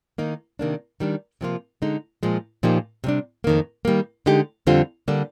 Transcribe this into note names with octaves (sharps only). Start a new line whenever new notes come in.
D#3 A#3 D#4
C3 D#3 A#3 D4
D#3 G3 D4
C3 F3 A#3 F4
D3 G#3 D#4
A#2 F3 G#3
A#2 F3 A#3 D#4 G4
C3 G3 D4
F2 D#3 A#3
D#3 G3 A#3
D3 G#3 D#4 G4
F2 D3 G3 C4 F4
D3 G3 A#3 D4